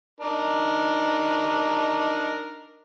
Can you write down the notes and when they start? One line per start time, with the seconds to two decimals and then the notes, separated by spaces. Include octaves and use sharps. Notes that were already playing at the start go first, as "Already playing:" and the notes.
0.20 D4 D#4 A#4